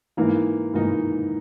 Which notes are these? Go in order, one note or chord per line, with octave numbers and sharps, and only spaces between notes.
G#2 E3 A#3 D#4
G#2 E3 A#3 D#4